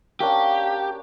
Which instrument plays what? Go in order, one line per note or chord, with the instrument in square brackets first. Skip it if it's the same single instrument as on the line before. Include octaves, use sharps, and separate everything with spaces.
[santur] A#3 C#4 D4 [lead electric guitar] G4